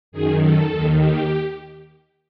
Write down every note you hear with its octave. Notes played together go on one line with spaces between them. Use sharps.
F#2 D#3 G#4
A4
D#2 D#3
G4